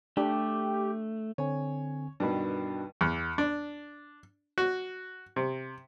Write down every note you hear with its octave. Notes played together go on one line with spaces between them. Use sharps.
A3 D4 G4
D3 C4 C#5 G#5
G2 B2 D#3 D4 F#4 B5
E2
D4
F#4
C3